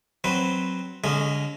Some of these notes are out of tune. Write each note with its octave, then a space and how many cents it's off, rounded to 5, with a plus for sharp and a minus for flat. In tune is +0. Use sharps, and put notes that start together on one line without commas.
F#3 +0 C4 +0 B4 +0
D3 -40 G#3 -20 C#4 +0